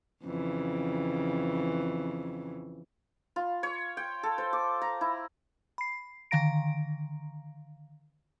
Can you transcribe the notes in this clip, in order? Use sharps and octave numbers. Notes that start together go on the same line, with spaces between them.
F2 C#3 E3
F4
C#5
G5
A4
C5
D6
A#5
E4
B5 C7
D3 D#3 F5 A#5 A#6 D7